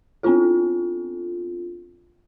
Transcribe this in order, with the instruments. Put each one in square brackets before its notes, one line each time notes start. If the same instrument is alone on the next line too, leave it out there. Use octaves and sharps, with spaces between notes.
[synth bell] B3 C4 D4 F4 A4